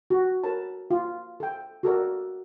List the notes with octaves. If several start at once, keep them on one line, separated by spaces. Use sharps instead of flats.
F#4
A4 A#4 C#5 A5 B5
F4
A4 G5
F#4 A4 A#4 D5